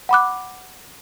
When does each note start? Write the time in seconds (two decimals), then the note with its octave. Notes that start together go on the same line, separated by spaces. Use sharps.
0.09 F#5 B5 D6 F#6